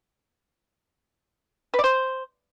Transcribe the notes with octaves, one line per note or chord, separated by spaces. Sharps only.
B4
D5
C5